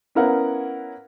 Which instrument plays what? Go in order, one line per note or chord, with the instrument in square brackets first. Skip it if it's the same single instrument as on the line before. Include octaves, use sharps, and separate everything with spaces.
[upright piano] B3 C#4 E4 A#4 F5 F#5